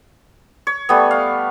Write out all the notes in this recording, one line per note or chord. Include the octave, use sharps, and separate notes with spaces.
C#5
G3 A3 B3
F5